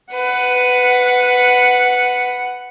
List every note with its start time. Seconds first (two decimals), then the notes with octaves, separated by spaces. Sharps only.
0.14 B4 F#5